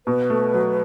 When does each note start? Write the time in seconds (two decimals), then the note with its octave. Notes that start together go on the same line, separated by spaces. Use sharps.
0.07 B2 B4
0.30 A3
0.54 F#3